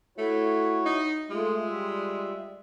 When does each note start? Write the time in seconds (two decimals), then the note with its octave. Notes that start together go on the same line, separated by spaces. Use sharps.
0.18 A3 E4 F#4 C#5
0.86 D#4
1.30 G#3 A3 F4
1.64 G3 F4 E5